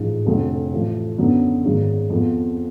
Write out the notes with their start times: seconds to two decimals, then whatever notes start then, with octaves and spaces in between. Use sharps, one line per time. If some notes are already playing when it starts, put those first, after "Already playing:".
Already playing: A1 G#2 F3
0.25 F1 F2 D3 F#3
0.72 A1 A2 F3
1.17 F#2 D3 F#3 B3 D4
1.64 G#1 G#2 F#3
2.10 F2 F3 B3